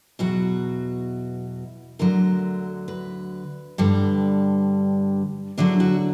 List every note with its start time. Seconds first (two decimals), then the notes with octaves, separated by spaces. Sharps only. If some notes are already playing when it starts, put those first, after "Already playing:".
0.19 E2 B2 F#3 F#4
1.99 D2 D3 F#3 A#4
2.88 B4
3.78 G2 D3 G3
5.58 E2 D3 F#3 D4
5.80 F#4